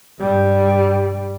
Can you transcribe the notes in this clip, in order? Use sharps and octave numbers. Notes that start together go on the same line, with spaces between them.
G2 G3